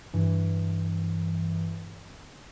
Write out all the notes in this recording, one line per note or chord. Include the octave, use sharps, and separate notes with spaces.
G2 E3